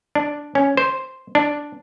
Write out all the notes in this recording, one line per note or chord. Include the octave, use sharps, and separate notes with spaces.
D4
C#4
C5
D4